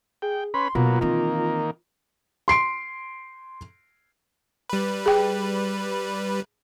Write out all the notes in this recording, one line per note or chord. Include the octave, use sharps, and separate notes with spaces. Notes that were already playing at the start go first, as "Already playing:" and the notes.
G#4 G5
C#4 B4 B5 C6
B2 F#3 A#3 B3 F4
D#3 E3 A#3 C4
C6 C7 D7
G3 B4
G#4 G5